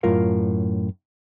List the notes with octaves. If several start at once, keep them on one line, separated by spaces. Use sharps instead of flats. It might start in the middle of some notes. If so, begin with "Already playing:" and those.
F#2 A2 F4 A#4 F5